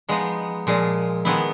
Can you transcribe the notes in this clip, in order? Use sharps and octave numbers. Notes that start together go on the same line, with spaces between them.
F3 G#3 B3 D#4
A#2 F3 G#3
D#3 G#3 B3 E4